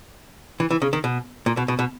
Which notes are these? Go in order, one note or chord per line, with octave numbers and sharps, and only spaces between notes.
E3
E3
C#3
D#3
B2
A#2
B2
B2
B2